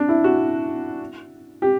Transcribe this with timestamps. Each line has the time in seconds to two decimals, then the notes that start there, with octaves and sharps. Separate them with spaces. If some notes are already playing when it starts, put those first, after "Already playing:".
Already playing: D4
0.09 E4
0.24 F#4
1.62 G4